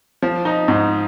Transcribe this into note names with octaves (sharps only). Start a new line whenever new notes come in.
F3
D#4
G#2